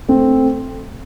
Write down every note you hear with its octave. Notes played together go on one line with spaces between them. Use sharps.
A3 C4